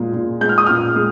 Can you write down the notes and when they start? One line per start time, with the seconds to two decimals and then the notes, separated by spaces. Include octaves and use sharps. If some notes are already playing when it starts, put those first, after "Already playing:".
Already playing: A#2 G#3
0.14 A#2
0.41 G#3 G6
0.49 F6
0.58 D#6
0.66 A#2 F6
0.96 G#3